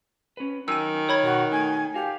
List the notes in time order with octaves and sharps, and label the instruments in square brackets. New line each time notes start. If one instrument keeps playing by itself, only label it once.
[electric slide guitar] C#4 B4
[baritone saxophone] D#3 [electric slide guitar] F#3 G#5 [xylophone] E6 D#7
[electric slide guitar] A#4 [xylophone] C#5 B5 G#6
[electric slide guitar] B2 [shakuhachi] F#4
[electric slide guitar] A3 D#4 [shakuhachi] G#5
[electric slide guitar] F#4 F5 [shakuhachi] G4